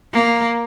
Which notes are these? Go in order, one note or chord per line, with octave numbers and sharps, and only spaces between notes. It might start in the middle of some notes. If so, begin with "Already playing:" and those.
A#3